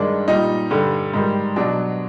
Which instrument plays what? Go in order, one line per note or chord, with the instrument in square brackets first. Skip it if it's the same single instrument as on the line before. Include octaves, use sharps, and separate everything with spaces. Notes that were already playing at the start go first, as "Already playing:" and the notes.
Already playing: [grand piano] G2 D#3 G#3 D4
A#2 G3 D#4
G2 D3 G3
G#2 D#3 G3
B2 F#3 D4